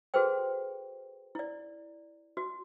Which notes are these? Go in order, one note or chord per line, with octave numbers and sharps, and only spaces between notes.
F#4 G#4 A4 B4 C5 G5
E4 D5
F#4